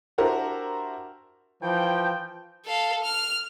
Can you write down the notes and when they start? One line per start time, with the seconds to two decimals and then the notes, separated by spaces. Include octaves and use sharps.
0.18 D4 E4 F#4 G4 A#4 C5
1.62 E3 F3 G5
2.66 A4 F5
3.04 F6